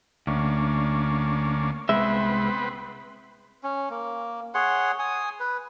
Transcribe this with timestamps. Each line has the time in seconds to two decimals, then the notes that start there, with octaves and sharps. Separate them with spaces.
0.27 D2 A#3 C#4 D4
1.89 C2 G#3 B3 C4 B4 E5
3.63 C#4
3.90 A#3
4.54 G#4 C#5 F#5 C6
4.99 G#5 D#6
5.40 B4